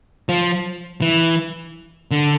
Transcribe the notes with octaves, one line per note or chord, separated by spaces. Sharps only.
F3
E3
D3